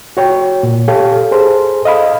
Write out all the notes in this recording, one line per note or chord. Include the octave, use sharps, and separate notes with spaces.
F#4 C#5 G5
A#2
G4 A4 C#5 F5
G#4 A4 C5
D#5 F5 B5